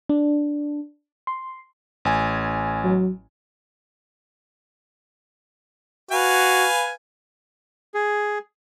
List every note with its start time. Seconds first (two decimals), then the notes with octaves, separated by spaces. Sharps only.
0.09 D4
1.27 C6
2.05 A1 G#5
2.84 F#3
6.11 F#4 B4 F5 G#5
7.94 G#4